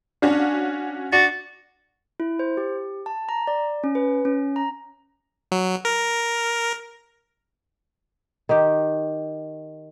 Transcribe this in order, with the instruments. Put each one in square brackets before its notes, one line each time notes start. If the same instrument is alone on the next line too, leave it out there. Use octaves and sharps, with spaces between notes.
[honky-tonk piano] C#4 F#4 F5 [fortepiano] D4
[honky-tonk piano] D4 [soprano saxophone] F#4 [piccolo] A6
[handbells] E4
C5
G4
A5
A#5
D5
C#4
B4
C#4
A#5
[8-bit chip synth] F#3
A#4
[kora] D#3 G4